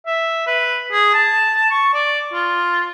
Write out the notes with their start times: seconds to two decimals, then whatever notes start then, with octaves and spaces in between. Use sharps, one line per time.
0.07 E5
0.47 B4
0.92 G#4
1.14 A5
1.71 C#6
1.94 D5
2.33 F4